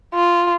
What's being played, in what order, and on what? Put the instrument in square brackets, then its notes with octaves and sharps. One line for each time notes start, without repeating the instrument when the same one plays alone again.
[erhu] F4